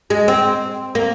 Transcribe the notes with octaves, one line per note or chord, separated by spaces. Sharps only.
G#3
C4
A#3